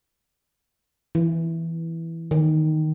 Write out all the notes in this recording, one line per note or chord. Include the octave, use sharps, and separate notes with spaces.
E3
D#3